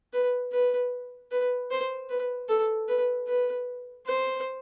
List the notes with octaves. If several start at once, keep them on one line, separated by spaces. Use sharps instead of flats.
B4
B4
B4
C5
B4
A4
B4
B4
C5